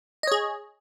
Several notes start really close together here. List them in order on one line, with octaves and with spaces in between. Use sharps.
D#5 C#5 G#4